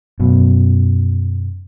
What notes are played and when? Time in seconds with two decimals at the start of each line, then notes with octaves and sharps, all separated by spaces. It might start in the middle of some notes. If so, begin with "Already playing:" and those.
0.19 F#2 B2